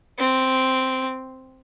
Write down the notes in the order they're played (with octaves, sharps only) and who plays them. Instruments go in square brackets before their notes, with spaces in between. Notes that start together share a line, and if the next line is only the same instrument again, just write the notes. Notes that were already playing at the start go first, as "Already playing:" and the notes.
[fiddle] C4